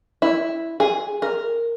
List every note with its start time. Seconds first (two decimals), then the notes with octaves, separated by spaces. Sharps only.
0.22 E4
0.80 G#4
1.22 A#4